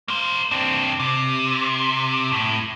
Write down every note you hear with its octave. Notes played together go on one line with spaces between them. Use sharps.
A#3 C5
C4 D4
C3
A2